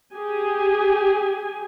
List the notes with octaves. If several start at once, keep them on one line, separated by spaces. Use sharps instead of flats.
G4 G#4 G#5